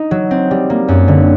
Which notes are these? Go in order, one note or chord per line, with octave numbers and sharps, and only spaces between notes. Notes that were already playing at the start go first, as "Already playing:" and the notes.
Already playing: D#4
F#3
C4
G3
A#3
F#2
D3